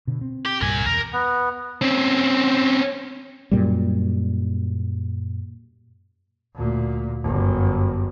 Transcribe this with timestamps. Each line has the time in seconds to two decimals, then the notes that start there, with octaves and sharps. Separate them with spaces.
0.07 B2 D3
0.21 C4
0.45 G4
0.61 C2 G2 A#2 A#4 G#5
0.86 E2 B2 A#4
1.13 B3
1.81 C4 C#4
3.52 F#2 A#2 G3
6.55 D2 A#2
7.22 G1 F#2